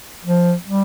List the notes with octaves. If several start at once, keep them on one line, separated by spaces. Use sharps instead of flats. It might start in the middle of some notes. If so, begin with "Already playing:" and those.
F3
G3